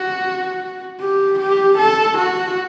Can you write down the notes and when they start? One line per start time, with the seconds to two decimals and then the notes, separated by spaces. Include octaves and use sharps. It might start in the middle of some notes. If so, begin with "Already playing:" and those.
Already playing: F#4
1.00 G4
1.40 G4
1.79 A4
2.18 F#4